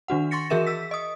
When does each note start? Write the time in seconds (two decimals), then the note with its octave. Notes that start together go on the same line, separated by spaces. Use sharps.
0.08 D#3 D4 F#4 F#5
0.31 C6 C#6 A6 A#6 C#7
0.50 E3 F#4 G#4 A#4 E5 E7
0.67 E6 B6
0.91 D#5 D#6